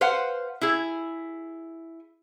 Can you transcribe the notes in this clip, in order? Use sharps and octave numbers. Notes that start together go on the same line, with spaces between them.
B4 C5 F5 F#5
E4 G#4